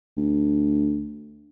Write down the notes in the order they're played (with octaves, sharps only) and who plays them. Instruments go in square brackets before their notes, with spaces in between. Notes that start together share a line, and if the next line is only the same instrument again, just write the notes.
[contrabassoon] D2